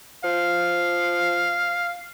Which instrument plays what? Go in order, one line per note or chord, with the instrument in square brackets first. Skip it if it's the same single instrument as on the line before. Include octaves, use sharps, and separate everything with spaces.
[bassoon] F3 [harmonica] F5